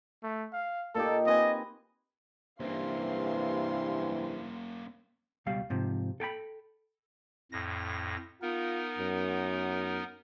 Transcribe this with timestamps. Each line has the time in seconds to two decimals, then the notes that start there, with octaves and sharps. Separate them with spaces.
0.23 A3
0.53 F5
0.95 A#2 D#4 G4 A4
1.26 C4 B4 D#5 G#5
2.60 G2 C3 E3 A#3 C#4 F5 C6
5.46 C#2 B2 G3 F5
5.70 G#2 C3 F3
6.20 A4 G5 G#5 B5
7.52 F2 A2 A#6
8.42 B3 D#4 F4 A#4
8.98 F#2